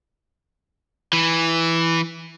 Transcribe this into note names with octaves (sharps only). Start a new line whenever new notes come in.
E3